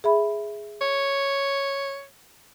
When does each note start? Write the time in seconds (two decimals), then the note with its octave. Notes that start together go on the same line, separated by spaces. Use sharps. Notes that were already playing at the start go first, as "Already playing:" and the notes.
0.04 G#4 E5 B5
0.81 C#5